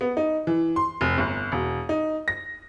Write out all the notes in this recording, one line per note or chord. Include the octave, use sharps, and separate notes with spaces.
B3
D#4
E3
C6
F1
G1
E1
D#4
A#6